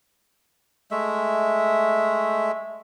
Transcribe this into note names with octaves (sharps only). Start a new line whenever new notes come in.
G#3 A3 E5